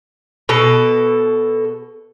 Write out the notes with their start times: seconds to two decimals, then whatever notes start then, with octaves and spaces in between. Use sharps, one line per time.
0.49 B2 A4